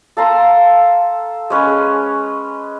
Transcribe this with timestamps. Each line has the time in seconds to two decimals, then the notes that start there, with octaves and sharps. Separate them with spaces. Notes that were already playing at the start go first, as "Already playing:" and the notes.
0.17 A4 F5 A#5 C6
1.50 G#3 C#4 B4